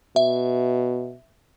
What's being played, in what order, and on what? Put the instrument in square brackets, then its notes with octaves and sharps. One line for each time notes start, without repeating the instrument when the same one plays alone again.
[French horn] B2 [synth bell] E5